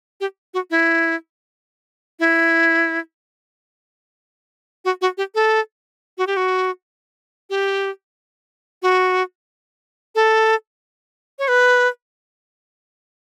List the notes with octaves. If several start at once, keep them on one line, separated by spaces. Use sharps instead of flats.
G4
F#4
E4
E4
F#4
F#4
G4
A4
F#4
G4
F#4
G4
F#4
A4
C#5
B4